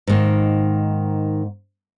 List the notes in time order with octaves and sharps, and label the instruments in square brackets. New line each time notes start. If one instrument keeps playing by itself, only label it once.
[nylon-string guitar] G#2 D#3 A#3